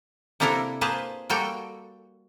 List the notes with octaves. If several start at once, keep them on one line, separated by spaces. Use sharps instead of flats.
C3 A#3 D4 E4 A4 A#4
A#3 G#4 B4 C5 A5
G3 A#3 F#4 A4 G5